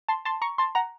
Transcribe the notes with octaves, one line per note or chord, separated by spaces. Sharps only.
A5 C6
A5 C6
A#5 C#6
A5 C6
F#5 A#5